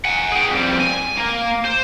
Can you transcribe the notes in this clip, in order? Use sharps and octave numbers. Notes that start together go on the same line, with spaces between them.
F#5 G#5
G#4 G5
F2 G3
G#5
A#3
C5